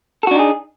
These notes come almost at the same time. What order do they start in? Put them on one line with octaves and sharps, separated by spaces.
A4 F#4 D4 D#4 G#4